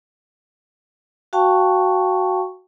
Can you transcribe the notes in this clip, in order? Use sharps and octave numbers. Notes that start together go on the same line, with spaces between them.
F#4 F5 G5 A5 C#6